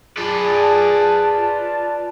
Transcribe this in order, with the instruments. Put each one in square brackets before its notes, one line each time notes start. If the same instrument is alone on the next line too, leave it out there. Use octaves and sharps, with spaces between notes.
[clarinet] F4 [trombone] G#4 [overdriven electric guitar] B4 D5 [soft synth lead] A5